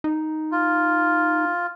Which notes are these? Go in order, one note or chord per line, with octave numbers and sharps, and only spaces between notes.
D#4
F4